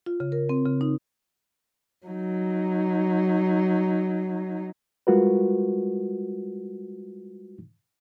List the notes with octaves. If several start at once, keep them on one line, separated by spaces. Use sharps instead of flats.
F4
C#3
A#4
C4
C#3
D#4
F#3 D#4
G3 G#3 F4 F#4 A#4 B4